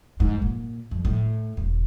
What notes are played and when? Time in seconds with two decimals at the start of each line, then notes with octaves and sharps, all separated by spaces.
0.20 G#2
0.42 A#2
0.91 F2
1.05 A2
1.57 E1